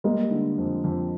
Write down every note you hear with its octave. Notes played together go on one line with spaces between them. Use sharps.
G3 G#3 A#3
D3
F2
F2